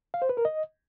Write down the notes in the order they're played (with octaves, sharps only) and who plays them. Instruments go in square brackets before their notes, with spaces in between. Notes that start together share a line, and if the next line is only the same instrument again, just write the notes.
[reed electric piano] F5
C5
B4
A#4
D#5